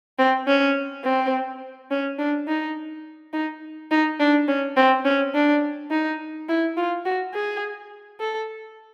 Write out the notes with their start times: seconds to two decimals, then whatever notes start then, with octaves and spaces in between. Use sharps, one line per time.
0.19 C4
0.47 C#4
1.04 C4
1.91 C#4
2.19 D4
2.48 D#4
3.33 D#4
3.91 D#4
4.20 D4
4.48 C#4
4.77 C4
5.05 C#4
5.34 D4
5.90 D#4
6.49 E4
6.77 F4
7.05 F#4
7.34 G#4
8.20 A4